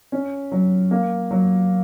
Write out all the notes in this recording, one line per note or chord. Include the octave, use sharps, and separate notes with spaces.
C#4
F#3
A#3
F#3